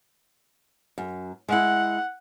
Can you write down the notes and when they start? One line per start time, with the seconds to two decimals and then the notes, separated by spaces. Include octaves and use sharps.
0.98 F#2
1.49 G#3 E4 F#5